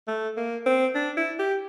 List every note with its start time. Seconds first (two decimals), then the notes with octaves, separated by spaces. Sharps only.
0.08 A3
0.37 A#3
0.66 C4
0.95 D4
1.17 E4
1.39 G4